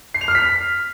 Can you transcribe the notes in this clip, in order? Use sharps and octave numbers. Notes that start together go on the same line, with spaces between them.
C7
F7
F6
B6